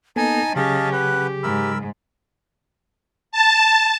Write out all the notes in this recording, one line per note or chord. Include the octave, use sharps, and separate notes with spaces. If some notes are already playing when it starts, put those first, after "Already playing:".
A#3 B3 D#4 A4 G#5 A5
C#3 F#3 C#4 G4 G#4 D#5 F5 A5
B4 F#5
G#2 A#4 B5 E6
A5